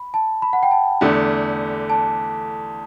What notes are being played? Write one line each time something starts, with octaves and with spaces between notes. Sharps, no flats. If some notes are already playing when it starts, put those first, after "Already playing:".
Already playing: B5
A5
B5
F#5
G5
A5
E2 D3 A3
A5